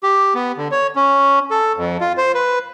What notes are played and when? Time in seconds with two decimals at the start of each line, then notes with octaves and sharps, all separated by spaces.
0.03 G4
0.34 B3
0.58 D3
0.72 C#5
0.96 C#4
1.51 A4
1.77 F2
2.01 F4
2.18 C5
2.34 B4